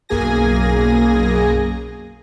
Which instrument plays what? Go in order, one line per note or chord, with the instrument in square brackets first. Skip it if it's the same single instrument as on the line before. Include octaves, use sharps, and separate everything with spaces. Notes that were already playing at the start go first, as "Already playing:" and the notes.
[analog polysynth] B1 F#2 A#3 G#4 G#5 A#6